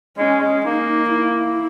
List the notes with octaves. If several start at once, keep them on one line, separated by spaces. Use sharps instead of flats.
G#3 C#4
G#3
A#3 D#4
E4